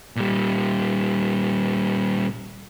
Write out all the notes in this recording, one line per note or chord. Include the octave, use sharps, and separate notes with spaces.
A#2 G3